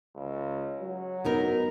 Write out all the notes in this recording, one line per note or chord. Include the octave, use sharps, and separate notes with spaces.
C#2
F#3
B3 D#4 A#4